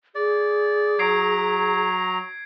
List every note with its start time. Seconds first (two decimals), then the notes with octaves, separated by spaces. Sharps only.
0.15 G#4 D5
0.99 F#3 A#5 G#6 C7 D7